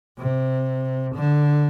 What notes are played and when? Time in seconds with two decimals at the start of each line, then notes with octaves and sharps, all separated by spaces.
0.19 C3
1.15 D3